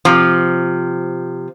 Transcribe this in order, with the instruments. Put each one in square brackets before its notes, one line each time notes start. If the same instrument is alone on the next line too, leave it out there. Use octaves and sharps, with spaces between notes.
[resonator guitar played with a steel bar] C3 F3